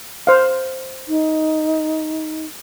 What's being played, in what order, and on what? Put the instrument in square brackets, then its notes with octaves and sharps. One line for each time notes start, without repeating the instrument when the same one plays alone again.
[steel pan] C5 F5
[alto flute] D#4